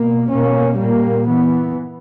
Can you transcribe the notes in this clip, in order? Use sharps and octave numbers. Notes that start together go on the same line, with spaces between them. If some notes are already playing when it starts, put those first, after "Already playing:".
Already playing: B2 A#3
B2 A#3 C#4
A#2 G3 A#3
E3 B3